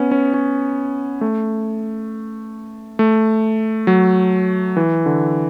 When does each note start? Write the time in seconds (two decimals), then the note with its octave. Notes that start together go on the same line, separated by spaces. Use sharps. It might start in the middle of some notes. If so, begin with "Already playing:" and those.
Already playing: B3 C#4
0.11 C#4
0.34 C#4
1.21 A3
2.99 A3
3.87 F#3
4.77 E3
5.06 D3